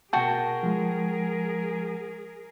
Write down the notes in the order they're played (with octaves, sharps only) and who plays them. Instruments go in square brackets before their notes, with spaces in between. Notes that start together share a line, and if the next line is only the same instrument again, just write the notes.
[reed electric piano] B2 A5 [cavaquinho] F#4 G5 [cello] G#4 A#4
[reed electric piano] F3 G#3